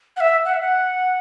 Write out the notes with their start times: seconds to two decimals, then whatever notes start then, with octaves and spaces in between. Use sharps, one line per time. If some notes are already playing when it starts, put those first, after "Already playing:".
0.17 F#5
0.20 E5
0.45 F#5
0.54 E5
0.61 F#5